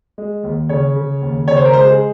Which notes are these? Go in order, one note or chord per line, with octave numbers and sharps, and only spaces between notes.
G#3
D#2
C#3 C#5
C#3
D#2
C#3 C#5
C5
A#4
G#3 C5
G#4